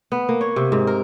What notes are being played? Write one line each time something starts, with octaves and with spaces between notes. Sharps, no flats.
B3
A#3
C#5
C3
G#2
A#4